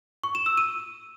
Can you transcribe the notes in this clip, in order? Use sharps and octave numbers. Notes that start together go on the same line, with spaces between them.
C#6
E7
E6
D#7